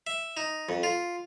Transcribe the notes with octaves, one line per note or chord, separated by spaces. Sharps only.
E5
D#4
F2
F4